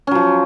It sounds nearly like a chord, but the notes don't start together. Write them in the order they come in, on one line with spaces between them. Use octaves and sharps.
C#4 F#3 F3